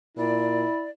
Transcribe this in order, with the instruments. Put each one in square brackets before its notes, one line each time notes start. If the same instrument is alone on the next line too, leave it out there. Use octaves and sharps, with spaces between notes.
[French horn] A#2 [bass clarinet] E4 [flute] D5